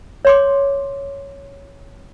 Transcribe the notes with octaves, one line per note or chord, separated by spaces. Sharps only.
C#5 C6 D6